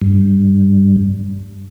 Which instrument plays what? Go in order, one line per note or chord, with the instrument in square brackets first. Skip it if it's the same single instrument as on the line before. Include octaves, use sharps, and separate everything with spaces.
[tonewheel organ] G2